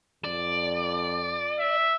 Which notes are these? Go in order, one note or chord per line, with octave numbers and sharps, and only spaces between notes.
F2 D5
E5